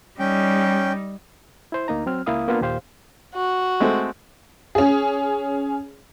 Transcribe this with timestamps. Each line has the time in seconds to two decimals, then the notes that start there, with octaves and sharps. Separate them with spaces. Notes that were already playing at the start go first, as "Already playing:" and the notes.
0.19 G3 C#4 D#4 G5
1.72 E4 C5
1.88 D2 A#3 D#4 A#5
2.06 F#3 C4 F6
2.26 C#2 A#3 E4 F5 D#6
2.48 A#3 B3 D4 F4
2.61 D#2 A#2 G4 C5 F5
3.35 F#4
3.80 G#3 A3 C4
4.75 C#4 G#4